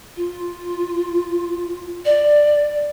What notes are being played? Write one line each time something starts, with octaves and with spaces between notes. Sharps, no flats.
F4
D5